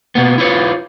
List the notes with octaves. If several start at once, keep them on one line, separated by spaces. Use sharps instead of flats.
B2 A#3 B3
E4 F4 B4 C#5